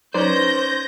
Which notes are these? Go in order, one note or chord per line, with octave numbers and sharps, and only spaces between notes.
F#3 C#4 D#4 B4 C5 D5 G6 A#6